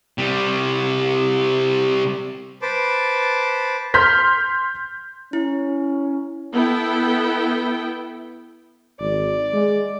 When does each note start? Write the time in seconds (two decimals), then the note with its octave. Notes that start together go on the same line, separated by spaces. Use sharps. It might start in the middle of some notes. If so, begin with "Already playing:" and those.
0.18 C3 G3
2.62 B4 C5 A5 D6
3.94 C6 F6 G6 B6
5.33 C#4 E4
6.54 B3 E4 A4 G5
8.99 G#1 D5
9.53 G#3